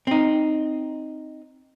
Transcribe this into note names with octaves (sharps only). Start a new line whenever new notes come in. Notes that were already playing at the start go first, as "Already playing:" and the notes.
C4 D#4